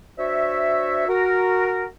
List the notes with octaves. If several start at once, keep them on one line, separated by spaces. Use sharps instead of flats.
D4 F#4 C5 C#5 E5
F#4 A#4